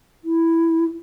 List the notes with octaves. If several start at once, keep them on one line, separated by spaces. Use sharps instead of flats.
E4